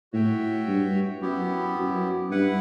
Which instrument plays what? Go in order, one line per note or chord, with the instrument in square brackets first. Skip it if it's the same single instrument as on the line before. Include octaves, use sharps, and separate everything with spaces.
[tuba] A2 [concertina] F#4 C#5 E5 G5
[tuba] G2
[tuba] F#2 [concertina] B3 E4 G4
[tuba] F#2
[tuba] G2 [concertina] E4 B4 F#5